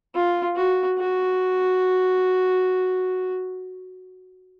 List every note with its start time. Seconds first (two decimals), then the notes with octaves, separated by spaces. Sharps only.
0.15 F4
0.56 F#4
0.98 F#4